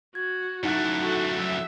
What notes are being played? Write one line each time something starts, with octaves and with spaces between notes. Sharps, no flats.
F#4 G#6
F#2 A3 D#4 E4 F#5 F#6
F#4 A4
F#3 E5